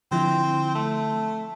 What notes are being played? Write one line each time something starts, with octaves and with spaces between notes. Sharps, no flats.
D3 F3 C4 E4
A3